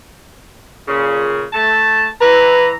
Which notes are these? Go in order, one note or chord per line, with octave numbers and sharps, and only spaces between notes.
A#2 C#3
A3 A5
E3 B4 A#5